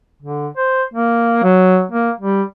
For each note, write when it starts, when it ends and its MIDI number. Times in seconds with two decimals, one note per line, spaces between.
0.22 0.48 50
0.57 0.83 72
0.94 1.40 58
1.43 1.83 54
1.92 2.11 58
2.20 2.43 55